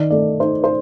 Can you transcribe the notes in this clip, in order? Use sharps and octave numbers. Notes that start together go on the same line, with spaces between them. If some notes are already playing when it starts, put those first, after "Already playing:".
Already playing: D#3 D5
A3 D5
D#4 C5
C5